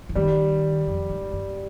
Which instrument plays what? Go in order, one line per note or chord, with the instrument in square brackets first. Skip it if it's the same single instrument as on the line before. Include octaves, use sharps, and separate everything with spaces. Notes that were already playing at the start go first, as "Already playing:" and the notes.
[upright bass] F3
[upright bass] D#3 [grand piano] G3
[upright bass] F2
G#2
G2